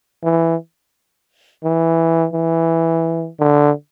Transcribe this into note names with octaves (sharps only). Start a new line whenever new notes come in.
E3
E3
E3
D3